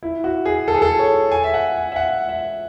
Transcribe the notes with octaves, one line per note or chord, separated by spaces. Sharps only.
E4
F#4
G#4
A4
G#4
A4
C#5
G#5
E5
F#5
G#5
E5
F#5
E5